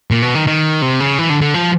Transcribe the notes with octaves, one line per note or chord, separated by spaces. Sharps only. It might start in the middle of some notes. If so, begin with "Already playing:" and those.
A#2
B2
D#3
D#3
C3
C#3
E3
D3
D3
F3